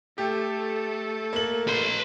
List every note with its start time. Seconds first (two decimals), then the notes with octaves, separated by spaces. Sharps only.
0.18 A3 G4 A4
1.33 A#3 F#7
1.68 B4 C6